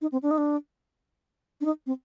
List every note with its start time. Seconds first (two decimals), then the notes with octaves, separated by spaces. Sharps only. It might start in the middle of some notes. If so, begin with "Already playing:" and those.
0.01 D#4
0.12 C4
0.23 D4
0.31 D#4
0.38 D4
1.61 D4
1.65 D#4
1.86 C4